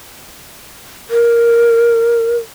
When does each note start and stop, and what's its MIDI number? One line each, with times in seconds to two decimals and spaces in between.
1.10 2.37 70